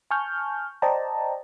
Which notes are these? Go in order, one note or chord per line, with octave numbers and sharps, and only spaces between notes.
G#5 A5 C#6 F6 G6
C5 D5 D#5 G5 A5 A#5